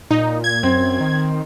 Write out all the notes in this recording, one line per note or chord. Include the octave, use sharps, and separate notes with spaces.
A#2 D#4
G#6
F#2 C4
D#3